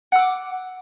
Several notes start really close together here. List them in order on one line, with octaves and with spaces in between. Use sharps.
F#5 E6 D6